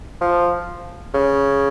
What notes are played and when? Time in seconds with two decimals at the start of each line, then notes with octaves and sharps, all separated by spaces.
0.21 F3
1.14 C#3